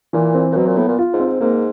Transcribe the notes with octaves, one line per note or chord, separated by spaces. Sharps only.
A#2 E3
C4
A#2
B2 F#3
A#2
A2 B3
A#2
F4
G#2
C4
G#2
G#2 A#3